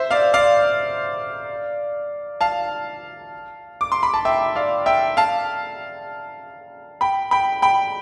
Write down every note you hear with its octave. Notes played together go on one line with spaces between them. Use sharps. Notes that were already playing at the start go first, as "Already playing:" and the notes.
Already playing: C5 E5
D5 F5
D5 F5
F5 A5
D6
C6
B5
A5
E5 G5
D5 F5
E5 G5
F5 A5
G5 B5
G5 B5
G5 B5